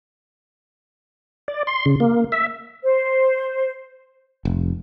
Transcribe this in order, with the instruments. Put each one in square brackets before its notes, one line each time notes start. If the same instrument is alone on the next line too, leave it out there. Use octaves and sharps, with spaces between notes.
[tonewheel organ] D5
C6
C#3
A#3
E5
[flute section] C5
[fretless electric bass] F1